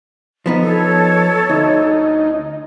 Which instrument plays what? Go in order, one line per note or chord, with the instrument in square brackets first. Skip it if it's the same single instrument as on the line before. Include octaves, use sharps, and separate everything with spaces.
[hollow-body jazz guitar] F3 B3 D#4
[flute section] A4 C#5
[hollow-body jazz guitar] D2 [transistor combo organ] D#4